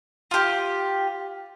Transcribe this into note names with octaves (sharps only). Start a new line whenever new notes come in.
F4 G4